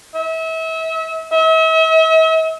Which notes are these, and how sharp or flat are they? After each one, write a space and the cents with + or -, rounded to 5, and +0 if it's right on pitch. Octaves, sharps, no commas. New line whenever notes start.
E5 -35
E5 -45